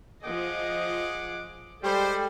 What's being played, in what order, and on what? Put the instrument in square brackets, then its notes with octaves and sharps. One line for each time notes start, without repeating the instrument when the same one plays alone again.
[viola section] F3 D#5 [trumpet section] G#4 F#5 D6
[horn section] G3 [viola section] G#3 A4 [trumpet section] C5